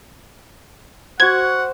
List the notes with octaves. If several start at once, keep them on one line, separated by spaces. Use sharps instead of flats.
F#4 C5 F#5 G#6